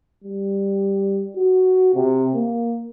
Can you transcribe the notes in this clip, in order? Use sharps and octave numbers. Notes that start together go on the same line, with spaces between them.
G3
F#4
C3
A#3